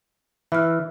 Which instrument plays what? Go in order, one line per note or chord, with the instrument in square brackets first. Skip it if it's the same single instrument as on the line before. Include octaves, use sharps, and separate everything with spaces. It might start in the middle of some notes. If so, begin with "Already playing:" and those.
[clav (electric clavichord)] E3 [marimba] E5 F6